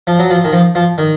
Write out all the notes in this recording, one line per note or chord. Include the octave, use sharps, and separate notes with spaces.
F3
F#3
F3
D#3
F3
F3
D#3